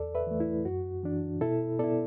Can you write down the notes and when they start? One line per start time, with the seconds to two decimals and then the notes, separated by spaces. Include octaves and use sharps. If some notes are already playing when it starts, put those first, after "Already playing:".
Already playing: E2 A4 D5
0.15 B4 E5
0.27 E3 A3
0.40 E4
0.65 F#2 F#4
1.03 E3 D4
1.41 B2 E4 A4
1.79 B3 E4 A4 D5